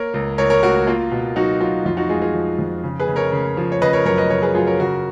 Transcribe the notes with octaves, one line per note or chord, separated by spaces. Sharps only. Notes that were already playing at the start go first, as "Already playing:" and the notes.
Already playing: A#3 A#4 C#5
C#2
C#2 A#4 C#5
A#4 C#5
C#2 F#4 A#4
A#3 F4
B2
F#3 D#4 F#4
F#3 F4
F2 F4
D#4 F#4
G#3 F4 G#4
F4 G#4
F3
F2
C#3
G#4 B4
C#3
A#4 C#5
C#3
F3
C#5
C#3 B4 D#5
A#4 C#5
F#2 A#4 C#5
B4 D#5
C#3 A#4 C#5
G#4 B4
F#3 F4 G#4
A#4 C#5
C#3 F#4 A#4